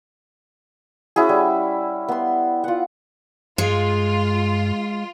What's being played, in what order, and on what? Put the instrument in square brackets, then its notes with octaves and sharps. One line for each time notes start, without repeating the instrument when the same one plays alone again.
[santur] C#4 E4 F#4 G#4
G3
B3 C6
F4 F#5
[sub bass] G2 [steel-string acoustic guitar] G#3 [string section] F4